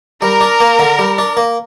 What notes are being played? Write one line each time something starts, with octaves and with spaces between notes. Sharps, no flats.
G3 A#4
D4
A#3
D3
G3
D4
A#3